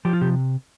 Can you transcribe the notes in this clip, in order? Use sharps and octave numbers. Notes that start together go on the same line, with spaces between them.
F3 G4
F4
C3 G4